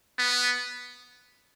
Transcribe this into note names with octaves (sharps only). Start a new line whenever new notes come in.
B3